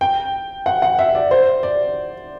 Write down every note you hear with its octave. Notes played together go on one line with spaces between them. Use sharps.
G5
F#5
F#5
E5
D5
C5
D5